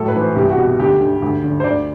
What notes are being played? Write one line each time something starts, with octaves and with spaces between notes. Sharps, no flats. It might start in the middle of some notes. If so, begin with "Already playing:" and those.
Already playing: A2 F#3 A4
B4
E3
C5
C2 G4
G4
F#4
B2
D2 G4
D3
D2
D3
C5
D2 D5